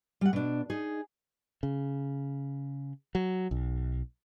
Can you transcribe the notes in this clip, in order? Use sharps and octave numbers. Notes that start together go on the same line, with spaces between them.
G3 F#5
B2 D4
D#4 G#4
C#3
F#3
B1